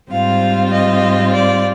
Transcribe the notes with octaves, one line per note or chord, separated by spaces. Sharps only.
G#2 G3 C4 F4 F5
D#5
D5